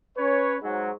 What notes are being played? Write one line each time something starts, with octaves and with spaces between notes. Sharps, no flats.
C#4 B4 C#5
G#2 F#3